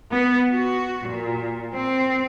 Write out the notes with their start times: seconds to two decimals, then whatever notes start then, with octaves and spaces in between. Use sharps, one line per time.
0.11 B3
0.51 F#4
1.07 A#2
1.74 C4